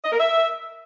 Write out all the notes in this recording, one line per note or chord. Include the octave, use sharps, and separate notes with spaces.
D#5
A#4
E5